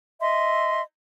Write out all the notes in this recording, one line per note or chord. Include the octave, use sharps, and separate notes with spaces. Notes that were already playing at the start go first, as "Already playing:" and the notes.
D#5 E5 C6